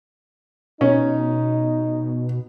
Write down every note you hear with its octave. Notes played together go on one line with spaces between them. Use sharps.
B2 C#4 D#4